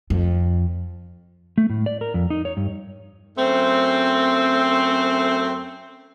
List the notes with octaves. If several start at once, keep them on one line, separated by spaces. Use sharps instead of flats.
F2
A3
A2
D5
A#4
F2
D#4
C#5
G2
F#2 A3 C4